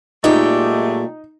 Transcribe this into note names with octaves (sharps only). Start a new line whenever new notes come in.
A#2 F#3 G#3 A3 D#4 G4